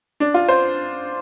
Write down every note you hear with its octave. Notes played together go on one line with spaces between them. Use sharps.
D4
F4
C5